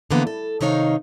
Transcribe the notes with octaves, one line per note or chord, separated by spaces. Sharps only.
D3 E3 F3 A#3 B3
A4
C3 D#3 D#4 C#5 F5